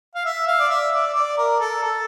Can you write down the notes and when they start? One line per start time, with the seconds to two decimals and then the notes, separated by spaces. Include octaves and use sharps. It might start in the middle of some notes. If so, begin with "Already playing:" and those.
0.15 F5
0.25 E5
0.47 F5
0.59 D5
0.69 E5
0.93 D5
1.14 D5
1.38 A#4
1.60 A4
1.83 A4